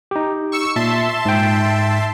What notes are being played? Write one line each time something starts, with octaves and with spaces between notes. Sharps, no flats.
D#4 G4
C#6 E6 C#7
A#2 E5 A5 C6
G#2 G5